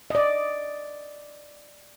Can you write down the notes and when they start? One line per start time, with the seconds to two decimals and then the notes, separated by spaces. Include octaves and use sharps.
0.10 D5 D#5